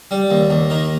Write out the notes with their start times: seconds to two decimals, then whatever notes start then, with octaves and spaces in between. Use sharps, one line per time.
0.11 G3
0.31 D#2
0.50 D#2
0.70 D#3